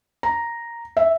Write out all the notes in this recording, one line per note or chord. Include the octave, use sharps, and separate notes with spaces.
A#5
E5